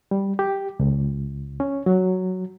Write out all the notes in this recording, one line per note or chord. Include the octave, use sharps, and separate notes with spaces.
G3
G4
C#2
C#4
F#3